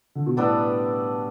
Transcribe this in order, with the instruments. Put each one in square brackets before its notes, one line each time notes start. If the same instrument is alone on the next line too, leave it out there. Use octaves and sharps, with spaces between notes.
[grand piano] D3
B2
[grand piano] A2 [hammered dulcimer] G3 B3 D4 A4